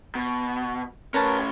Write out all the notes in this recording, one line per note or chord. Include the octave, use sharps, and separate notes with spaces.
B2
A2 C#4 A#4 B4 A5